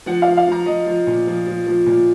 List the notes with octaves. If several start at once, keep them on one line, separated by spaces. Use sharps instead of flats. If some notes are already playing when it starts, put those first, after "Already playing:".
F3 F#5
F5
F3
F5
F3 A#5
F3 D#5
F3
A#2
F3
F3
F3
A#2